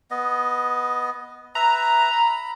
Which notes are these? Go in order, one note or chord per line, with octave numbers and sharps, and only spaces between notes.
B3 D#5
B4 E5 A#5
B5